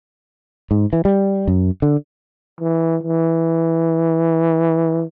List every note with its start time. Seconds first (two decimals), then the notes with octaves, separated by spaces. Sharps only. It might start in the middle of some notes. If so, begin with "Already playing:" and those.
0.71 G#2
0.93 E3
1.05 G3
1.48 F#2
1.82 D3
2.61 E3
3.03 E3